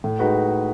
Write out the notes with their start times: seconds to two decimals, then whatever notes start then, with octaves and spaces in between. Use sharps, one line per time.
0.04 A2
0.19 G#3 D#4 F#4 B4